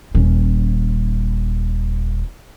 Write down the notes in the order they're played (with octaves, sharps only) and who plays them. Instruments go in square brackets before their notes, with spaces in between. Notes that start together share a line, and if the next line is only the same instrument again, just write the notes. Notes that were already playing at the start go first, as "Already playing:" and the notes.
[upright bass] D#1 C#4